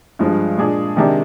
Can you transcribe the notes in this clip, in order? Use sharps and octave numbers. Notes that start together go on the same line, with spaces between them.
G2 F3 G#3
A#2 G#3 D4 G#4
C3 D#3 G#3 D4 G4